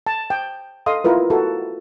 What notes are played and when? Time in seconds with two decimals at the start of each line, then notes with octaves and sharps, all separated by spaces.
0.07 A5
0.30 G5
0.86 A4 D#5 F5 C6 D#6
1.04 E4 F4 A#4 B4
1.30 F#4 A4 A#4 A#5